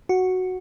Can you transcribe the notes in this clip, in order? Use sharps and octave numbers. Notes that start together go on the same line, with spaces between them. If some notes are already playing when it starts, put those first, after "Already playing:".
F#4